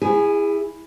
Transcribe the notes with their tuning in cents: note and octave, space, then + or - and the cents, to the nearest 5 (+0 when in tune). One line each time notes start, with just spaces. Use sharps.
E4 +0 G#4 -30 G#5 +0